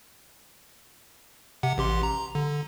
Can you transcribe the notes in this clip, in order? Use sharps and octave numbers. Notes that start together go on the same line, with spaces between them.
C3 F#5
A1 G4 C6
A#5
D3